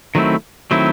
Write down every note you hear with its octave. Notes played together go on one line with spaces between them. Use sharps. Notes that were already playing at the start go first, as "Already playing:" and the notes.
D#3 F#3 A3 C4 E4
D#3 F#3 A3 C4 E4